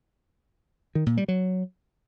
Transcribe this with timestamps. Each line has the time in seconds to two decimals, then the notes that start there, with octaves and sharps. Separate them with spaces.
0.95 D#3
1.06 A#2
1.17 G3
1.28 F#3